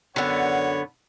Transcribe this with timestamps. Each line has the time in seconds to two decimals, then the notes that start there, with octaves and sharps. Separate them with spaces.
0.16 F#2 D3 B3 C#5 F#5